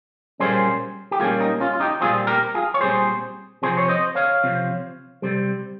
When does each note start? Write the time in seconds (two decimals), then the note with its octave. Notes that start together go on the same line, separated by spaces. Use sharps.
0.40 A#2 G3 A#3 C#4 G#4 C5
1.11 G4
1.20 A#2 G3 A#3 C#4 F4 G#4
1.40 D#4
1.60 C#4 F4
1.73 F4
1.80 D#4 G4
2.01 A#2 G3 C4 F4 G#4
2.27 G4 A#4
2.55 F4 G#4
2.74 C#5
2.81 A#2 G3 C4 G#4 C5
3.62 C3 F3 C4 G#4 C5
3.77 C#5
3.88 C5 D#5
4.15 C#5 F5
4.43 C3 F3 C4
5.22 C3 G3 C4